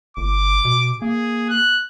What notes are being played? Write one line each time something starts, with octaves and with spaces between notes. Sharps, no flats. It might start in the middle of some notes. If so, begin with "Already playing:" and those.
G1 D6
B2
A#3 G#4
F#6